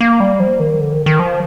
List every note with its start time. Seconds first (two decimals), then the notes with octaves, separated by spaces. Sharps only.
0.01 A#3
0.20 G3
0.40 F3
0.59 D#3
0.80 D3
0.92 D#3
1.06 D#3
1.19 F3